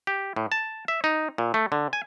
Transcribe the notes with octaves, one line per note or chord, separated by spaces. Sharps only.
G4
A2
A5
E5
D#4
A#2
A3
D3
G#5